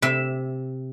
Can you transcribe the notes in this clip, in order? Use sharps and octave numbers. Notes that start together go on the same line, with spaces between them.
C3 E5